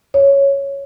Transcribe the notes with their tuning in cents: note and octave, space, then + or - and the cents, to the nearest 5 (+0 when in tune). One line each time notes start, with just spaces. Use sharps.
C#5 +0